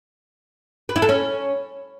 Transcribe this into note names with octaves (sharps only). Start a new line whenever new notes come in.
B4
E4
A4
C#4